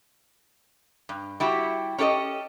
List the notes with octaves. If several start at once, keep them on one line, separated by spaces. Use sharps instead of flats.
G2
G3 E4 F#4 G4
C#4 G4 A4 C#5 D#5